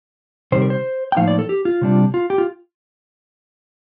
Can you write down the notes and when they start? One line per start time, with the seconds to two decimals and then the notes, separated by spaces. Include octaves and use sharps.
0.52 C3 D#3 G3 C5
0.62 A#4
0.70 C5
1.12 G5
1.17 A2 F3 A#3 D#4 F5
1.28 D5
1.39 A4
1.49 G4
1.65 F4
1.81 C3 G3 D4
2.14 F4
2.30 G4
2.38 F4